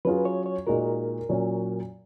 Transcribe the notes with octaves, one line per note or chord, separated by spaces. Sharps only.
F#3 C#4 F4 G#4 B4
C#5
C#5
A#2 G#3 D#4 F#4 A#4
A#2 F#3 C#4